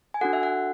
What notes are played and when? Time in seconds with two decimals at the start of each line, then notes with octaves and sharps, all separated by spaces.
0.14 G#5
0.21 D4 F#4 A4 F#5
0.33 E5
0.43 F#5